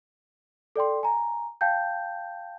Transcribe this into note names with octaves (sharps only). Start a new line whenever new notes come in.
A4 D5 G5 C6
G#5 A#5
F5 G5 A5 G6